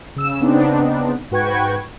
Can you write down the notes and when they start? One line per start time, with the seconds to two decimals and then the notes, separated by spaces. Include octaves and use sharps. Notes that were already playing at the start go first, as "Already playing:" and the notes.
0.16 C#3 E6 E7
0.40 C#3 B3 C4 D4 D#4
1.31 G#2 F#4 B4 G5 C#6 G#6